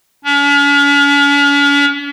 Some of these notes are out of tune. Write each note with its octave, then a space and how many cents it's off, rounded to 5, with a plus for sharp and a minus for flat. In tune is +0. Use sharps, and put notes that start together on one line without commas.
C#4 +45